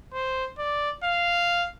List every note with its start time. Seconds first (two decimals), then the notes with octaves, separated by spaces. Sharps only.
0.14 C5
0.59 D5
1.04 F5